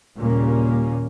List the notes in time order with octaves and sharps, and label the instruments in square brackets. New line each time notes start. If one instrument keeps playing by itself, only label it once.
[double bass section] D#2 A#2 C#3 G3 A#3 C#4